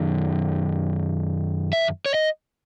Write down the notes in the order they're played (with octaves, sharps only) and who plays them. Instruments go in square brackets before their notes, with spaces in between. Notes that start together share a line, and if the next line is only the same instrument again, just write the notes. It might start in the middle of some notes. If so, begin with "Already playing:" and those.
Already playing: [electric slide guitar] F#2 D#3
E5
C#5
D#5